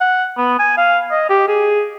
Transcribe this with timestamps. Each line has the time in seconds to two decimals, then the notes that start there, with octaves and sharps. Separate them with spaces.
0.01 F#5
0.38 B3
0.59 G#5
0.78 F5
1.11 D#5
1.29 G4
1.48 G#4